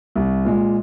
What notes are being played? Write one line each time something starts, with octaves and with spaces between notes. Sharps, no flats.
C2
A#2 G#3